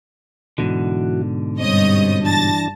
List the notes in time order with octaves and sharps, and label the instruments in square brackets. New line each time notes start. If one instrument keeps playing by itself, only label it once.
[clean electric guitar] G#2 B2 D3 [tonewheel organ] E3 F#4
[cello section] G2 G3 [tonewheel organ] C4 [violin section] C#5 D#5 D#6
[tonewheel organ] E3 D4 [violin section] A5 A6 A#6